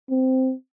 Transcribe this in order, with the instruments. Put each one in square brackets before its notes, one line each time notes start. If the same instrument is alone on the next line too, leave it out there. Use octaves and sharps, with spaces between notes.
[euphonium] C4